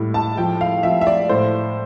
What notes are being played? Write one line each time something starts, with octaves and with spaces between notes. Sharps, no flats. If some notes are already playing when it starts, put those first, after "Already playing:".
Already playing: A2 G3
A5
F3 G5
F5
F3 E5
E5
D5
A2 C5